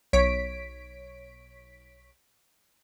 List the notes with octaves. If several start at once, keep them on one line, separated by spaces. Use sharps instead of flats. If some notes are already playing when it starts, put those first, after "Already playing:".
B1 C#5 B6 D7